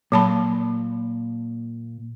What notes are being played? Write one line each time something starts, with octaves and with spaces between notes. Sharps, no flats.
A#2 F#3 A5 B5